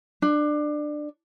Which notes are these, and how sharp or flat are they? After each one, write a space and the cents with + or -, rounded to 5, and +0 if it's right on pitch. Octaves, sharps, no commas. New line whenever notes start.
D4 +20